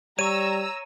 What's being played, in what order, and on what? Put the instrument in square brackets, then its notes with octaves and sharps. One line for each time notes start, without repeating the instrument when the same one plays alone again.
[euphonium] G3 [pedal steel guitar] C#5 C#6 [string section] A#5 E6 [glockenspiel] D#7